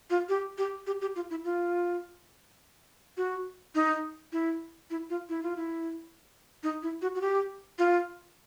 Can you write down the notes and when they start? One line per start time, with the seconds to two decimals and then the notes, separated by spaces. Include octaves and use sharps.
0.10 F4
0.29 G4
0.58 G4
0.87 G4
1.01 G4
1.16 F4
1.30 E4
1.44 F4
3.17 F#4
3.75 D#4
4.32 E4
4.90 E4
5.10 F4
5.29 E4
5.43 F4
5.57 E4
6.63 D#4
6.83 E4
7.02 F#4
7.15 F#4
7.21 G4
7.79 F4